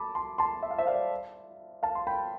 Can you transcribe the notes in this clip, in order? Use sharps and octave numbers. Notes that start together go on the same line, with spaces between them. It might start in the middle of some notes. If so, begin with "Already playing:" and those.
Already playing: A5 B5 D6
A5 C6
A5 C6
E5
F5
C5 E5
D5 F5
F5 A5
C6
G5 B5